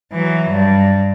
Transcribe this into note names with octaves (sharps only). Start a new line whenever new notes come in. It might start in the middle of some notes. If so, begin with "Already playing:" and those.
E3 F#3
G2